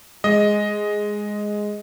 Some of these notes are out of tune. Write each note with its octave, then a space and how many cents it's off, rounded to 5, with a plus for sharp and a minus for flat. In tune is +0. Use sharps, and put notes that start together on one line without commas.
G#3 +0 D#5 +5